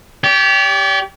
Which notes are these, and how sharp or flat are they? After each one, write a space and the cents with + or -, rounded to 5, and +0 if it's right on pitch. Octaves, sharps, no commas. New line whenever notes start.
G4 +0 D5 -45